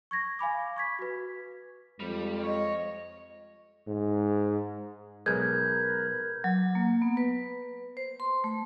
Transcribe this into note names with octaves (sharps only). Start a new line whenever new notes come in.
C#6 G#6 A#6
F5 G#5 B5 D6
C#6 G#6 B6
F#4 B4
F2 G3 G#3
C#5 D#5
G#2
B1 G#3 A#4 B4 G6 G#6
F#3
A#3
B3
B4
C5
C6
A3